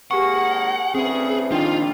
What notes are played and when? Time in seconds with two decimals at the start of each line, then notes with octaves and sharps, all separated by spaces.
0.11 G#1 A#3 G4 G#4 F#5 C#6
0.95 D2 C#3 E3 C4 G#4
1.52 A#1 D#3 D4 F4 G5